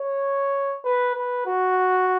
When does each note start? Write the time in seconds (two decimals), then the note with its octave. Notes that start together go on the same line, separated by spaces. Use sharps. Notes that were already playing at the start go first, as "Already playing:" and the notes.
Already playing: C#5
0.84 B4
1.15 B4
1.46 F#4